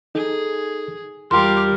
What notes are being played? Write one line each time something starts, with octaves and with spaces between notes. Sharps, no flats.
D#4 G#4 A4
E2 G3 F4 G4 A#4 F5 G5 C6